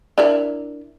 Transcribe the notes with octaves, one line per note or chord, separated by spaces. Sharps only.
D4 E4 A#4